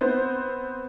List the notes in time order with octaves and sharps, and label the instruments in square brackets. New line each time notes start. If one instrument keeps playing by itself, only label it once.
[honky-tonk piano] B3 C4 C5